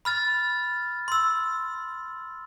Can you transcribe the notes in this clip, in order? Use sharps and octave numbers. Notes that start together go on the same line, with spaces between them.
B5 F6 A6
C6 E6